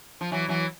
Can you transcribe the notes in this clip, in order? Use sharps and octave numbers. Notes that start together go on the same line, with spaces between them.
F3
E3 F#3
E3 F#3